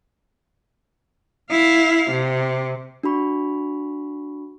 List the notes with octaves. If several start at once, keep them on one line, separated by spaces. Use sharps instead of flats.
E4 F5
C3
D4 F#4 B5 C#6